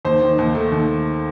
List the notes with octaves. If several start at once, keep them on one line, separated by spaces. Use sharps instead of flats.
D#2 C5
D#3
D#2
A3
D#2